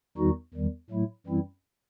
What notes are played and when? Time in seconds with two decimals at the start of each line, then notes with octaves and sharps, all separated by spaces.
0.17 E2 D#3 G3 D#4 F#4
0.54 E2 D#3 G3
0.90 A2 F#3 A3 E4
1.26 F#2 E3 G3 C4 E4